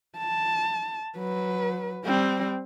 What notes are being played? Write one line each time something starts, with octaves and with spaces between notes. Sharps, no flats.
A5
F#3 B4
G3 C4